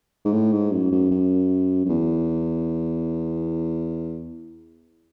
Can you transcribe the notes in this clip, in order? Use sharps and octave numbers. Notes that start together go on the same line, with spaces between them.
G#2
A2
G#2
F#2
F#2
F#2
F#2
E2